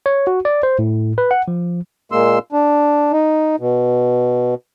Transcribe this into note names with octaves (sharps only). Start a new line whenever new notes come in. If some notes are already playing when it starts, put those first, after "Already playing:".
C#5
F#4
D5
C5
A2
B4
F#5
F3
A#2 G#3 A#3 C6 E6
D4
D#4
B2